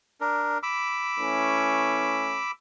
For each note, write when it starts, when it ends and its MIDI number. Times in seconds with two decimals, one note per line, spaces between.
0.21 0.58 62
0.21 0.58 70
0.63 2.51 83
0.63 2.51 86
0.63 2.51 88
1.19 2.40 52
1.19 2.40 57
1.19 2.40 61